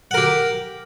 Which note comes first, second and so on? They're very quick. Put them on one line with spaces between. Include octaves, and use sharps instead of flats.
F#5 A#4 G4